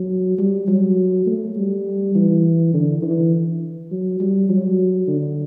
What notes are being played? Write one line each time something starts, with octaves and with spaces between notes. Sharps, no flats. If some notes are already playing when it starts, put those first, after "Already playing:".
Already playing: F#3
G3
F#3
A3
G3
E3
D3
E3
F#3
G3
F#3
D3